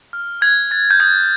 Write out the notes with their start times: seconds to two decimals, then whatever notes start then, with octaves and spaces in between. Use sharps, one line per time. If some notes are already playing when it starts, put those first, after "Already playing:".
0.13 F6
0.41 F#6 G#6
0.71 F#6 A6
0.91 G6
1.00 D#6 G#6